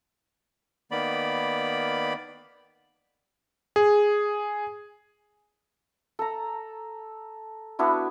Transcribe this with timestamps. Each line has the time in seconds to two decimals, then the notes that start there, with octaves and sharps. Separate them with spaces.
0.91 D#3 A#3 B3 D5 B5
3.76 G#4
6.19 A4 A#5
7.79 B3 D4 E4 F#4